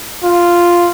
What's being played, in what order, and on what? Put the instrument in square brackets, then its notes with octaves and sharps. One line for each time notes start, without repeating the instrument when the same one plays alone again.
[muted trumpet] F4